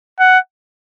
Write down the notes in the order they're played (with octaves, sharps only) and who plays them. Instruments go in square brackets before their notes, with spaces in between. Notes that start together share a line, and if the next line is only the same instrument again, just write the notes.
[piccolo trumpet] F#5